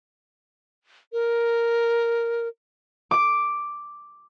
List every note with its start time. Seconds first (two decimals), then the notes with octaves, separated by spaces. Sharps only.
1.13 A#4
3.11 D6